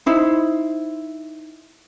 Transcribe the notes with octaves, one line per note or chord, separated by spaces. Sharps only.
D#4 E4 C5